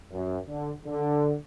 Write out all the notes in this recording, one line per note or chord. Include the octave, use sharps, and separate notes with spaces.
F#2
D3
D3